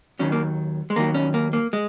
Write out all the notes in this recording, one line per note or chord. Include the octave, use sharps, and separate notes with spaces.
D#2 D#3 F#3 C#4
A#3
G#3
D#2 D#3 F#3 A#3
C#4
A#3
A#3
G#3